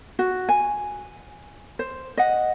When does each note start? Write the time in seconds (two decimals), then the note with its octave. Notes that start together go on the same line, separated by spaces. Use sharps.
0.19 F#4
0.49 G#5
1.79 C5
2.17 D#5 F#5